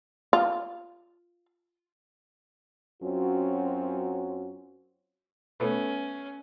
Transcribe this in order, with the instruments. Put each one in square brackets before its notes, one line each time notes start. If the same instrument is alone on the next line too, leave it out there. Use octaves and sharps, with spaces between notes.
[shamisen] F4
[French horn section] F#2 F#3 C4 C#4 F4 F#4
[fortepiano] A3 B3 [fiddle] C#4